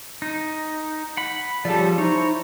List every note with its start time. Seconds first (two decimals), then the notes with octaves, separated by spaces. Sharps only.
0.22 D#4
1.17 F#5 B5
1.65 C#3 F3 G4 A4 D5
1.98 D#4 E4 C5 C#5 A#5